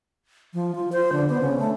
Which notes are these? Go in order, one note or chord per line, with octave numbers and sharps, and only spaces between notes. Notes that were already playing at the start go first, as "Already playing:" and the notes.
F3
F4
C5
D3
B3
C#3
A3